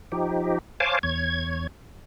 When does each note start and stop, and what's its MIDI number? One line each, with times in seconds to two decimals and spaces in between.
0.12 0.58 53
0.12 0.58 63
0.12 0.58 67
0.80 0.99 72
0.80 0.99 73
0.80 0.99 77
0.80 0.99 80
0.80 0.99 81
0.80 0.99 86
1.03 1.67 40
1.03 1.67 73
1.03 1.67 92